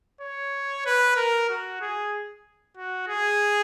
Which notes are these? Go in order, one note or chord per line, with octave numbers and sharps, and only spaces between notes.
C#5
B4
A#4
F#4
G#4
F#4
G#4